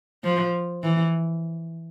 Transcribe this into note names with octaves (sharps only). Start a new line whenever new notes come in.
F3
E3